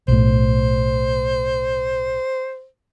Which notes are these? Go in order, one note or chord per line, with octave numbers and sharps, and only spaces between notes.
B1 A2 C5